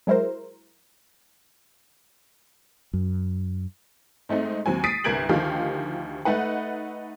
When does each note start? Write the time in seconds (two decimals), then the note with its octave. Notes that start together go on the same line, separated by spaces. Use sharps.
0.07 F#3 G#3 E4 A#4 C5
2.93 F#2
4.29 G#2 A3 C4 D#4
4.66 D#2 F#3 C4 G#5
4.84 D#6 A6 B6 C7 D7 D#7
5.04 G1 C2 A#4 G#6 D7 F#7
5.29 D2 D#3 F3 G4 F5
6.25 A3 D#4 B4 F#5